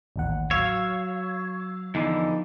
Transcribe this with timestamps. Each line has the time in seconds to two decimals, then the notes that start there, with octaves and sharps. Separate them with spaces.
0.16 A1 D#2 F#5
0.51 F#3 C#5 F5 E6
1.95 E2 D3 E3 F3 D#4